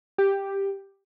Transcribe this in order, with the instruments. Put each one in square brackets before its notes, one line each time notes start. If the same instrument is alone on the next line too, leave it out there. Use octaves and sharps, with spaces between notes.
[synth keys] G4